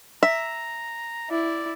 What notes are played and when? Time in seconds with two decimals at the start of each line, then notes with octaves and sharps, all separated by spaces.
0.23 E5 A#5
1.30 E4 D5